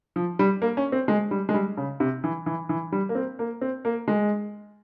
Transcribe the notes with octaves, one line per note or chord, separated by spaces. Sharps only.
F3
G3
A#3
C#4
C4
G#3
G3
G#3
G3
C#3
C3
E3
E3
E3
G3
A#3
C4
A#3
C4
A#3
G#3